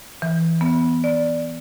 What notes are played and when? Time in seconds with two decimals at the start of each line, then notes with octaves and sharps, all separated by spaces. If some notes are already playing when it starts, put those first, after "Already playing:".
0.22 E3
0.61 B3
1.04 D5